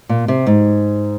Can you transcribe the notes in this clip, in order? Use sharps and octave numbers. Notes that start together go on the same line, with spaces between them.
A#2
C3
G#2